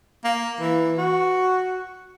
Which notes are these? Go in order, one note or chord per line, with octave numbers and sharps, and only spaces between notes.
A#3
E3
F#4